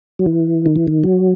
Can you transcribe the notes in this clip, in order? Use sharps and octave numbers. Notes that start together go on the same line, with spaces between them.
F#3
E3
D#3
E3
D#3
F#3